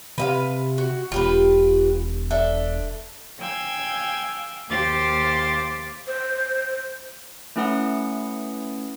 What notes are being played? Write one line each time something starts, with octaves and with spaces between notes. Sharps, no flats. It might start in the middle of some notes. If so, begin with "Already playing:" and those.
C3 B4 E5 F5
F#4
E1 F4 G4 B4
D4 A4 E5
F5 G5 G#5 E6 G#6
D#2 G4 C5 F5 D6 A6
C5
A3 C#4 E4 B4 F#5 D#6